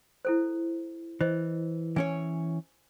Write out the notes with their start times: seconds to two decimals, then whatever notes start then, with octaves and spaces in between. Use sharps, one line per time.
0.25 E4 A4 C5
1.21 E3 C5 D#5
1.96 E3 C#4 C#5 G#5